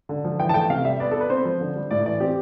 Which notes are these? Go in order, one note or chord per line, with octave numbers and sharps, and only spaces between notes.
D3
F3
E3 G5
A5
A3 G5
C3 F5
G3 E5
B3 D5
B3 A4
B4
C4 C5
F3
D3
G3
A2 D5
E3 D5
C4 G4